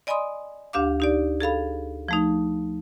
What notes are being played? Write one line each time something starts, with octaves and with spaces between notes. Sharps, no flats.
D5 D#5 G#5 B5 C6 D#6
D2 D4 G4 F5 D6
D#4 G4 D5
G#4 A4 F5 B5
F3 A3 D#4